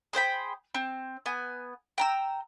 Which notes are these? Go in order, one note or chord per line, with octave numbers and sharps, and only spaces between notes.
G#4 C5 G5 B5
C4
B3 G#5
G5 A#5 E6